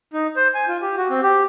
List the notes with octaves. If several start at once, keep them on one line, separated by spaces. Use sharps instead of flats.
D#4
C5
G#5
F4
G4
F#4
C4
G4